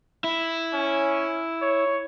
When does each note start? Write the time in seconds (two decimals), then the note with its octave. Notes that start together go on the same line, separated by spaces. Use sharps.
0.24 E4
0.73 C#4
1.62 C#5